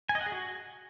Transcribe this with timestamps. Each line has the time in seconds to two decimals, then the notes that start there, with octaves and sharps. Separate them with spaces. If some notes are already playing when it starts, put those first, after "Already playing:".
0.09 G#5
0.15 D#5
0.21 F#5
0.26 G#4
0.32 F#4